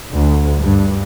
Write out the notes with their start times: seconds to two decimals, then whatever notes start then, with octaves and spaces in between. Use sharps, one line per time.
0.11 D2
0.60 G2